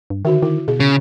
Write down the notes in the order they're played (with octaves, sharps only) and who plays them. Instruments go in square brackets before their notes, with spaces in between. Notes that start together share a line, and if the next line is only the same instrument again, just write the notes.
[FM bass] G2
[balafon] D3 F#4 E5 [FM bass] D#3
[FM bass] D#3 [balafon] E4
[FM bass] B2 [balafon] G#4
[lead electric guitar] C#3